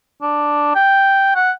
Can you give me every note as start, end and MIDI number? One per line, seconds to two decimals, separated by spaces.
0.22 0.74 62
0.75 1.31 79
1.36 1.51 78